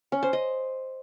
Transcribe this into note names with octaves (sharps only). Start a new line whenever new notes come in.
C#4
C5
D#5